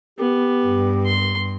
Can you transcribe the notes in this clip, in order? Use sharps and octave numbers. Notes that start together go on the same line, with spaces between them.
B3 G4
G2
C6